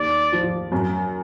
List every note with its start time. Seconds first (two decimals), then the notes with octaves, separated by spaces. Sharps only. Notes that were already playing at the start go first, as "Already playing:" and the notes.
Already playing: D#2 D5
0.33 F3
0.72 F#2